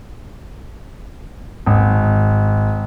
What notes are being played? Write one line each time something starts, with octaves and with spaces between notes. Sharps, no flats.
G#1